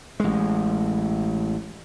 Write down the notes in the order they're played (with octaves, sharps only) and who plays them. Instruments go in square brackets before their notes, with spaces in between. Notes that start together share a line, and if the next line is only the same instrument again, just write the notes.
[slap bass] A1 G#3